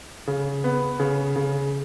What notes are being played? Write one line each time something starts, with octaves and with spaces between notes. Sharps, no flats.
C#3
B3
C#3
C#3